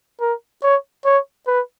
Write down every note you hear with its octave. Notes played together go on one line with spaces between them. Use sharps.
A#4
C#5
C#5
B4